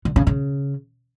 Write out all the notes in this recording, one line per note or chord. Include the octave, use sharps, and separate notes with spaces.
D3
C#3
C#3